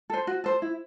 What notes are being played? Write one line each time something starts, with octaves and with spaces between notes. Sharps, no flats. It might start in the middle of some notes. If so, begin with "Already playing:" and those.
A4 C5
F#4
A4 C5
E4